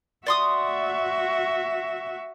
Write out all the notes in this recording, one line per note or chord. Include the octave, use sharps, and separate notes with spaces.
F#4 D5 E5 C6 D#6